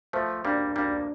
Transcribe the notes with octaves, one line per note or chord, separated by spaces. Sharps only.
F3 A3 C5
G3 A#3 D4
G3 A#3 D4